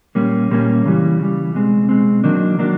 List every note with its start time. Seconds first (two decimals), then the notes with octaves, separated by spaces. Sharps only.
0.15 A#2 G3 A#3 C#4
0.51 A#2 G3 A#3 C#4
0.86 C#3 E3 G3
1.20 C#3 E3 G3
1.54 B2 G#3 C4
1.89 B2 G#3 C4
2.24 D#3 F#3 A#3 D4
2.59 D#3 F#3 A#3 D4